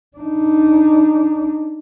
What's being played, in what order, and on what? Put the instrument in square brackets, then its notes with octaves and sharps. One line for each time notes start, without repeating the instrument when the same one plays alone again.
[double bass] D4 D#4